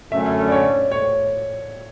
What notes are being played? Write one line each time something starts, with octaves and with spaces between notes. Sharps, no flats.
F#2 D3 A3 C#4 E5
D5
C#5
C#5